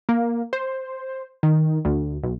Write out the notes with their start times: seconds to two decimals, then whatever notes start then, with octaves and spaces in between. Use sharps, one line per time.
0.09 A#3
0.53 C5
1.43 D#3
1.85 D2
2.23 B1